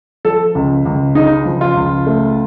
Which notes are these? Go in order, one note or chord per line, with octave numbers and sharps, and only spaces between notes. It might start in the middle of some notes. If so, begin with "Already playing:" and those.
F3 A4
C#2
C#2
C#3 D#4
F3
F4
C#2
A3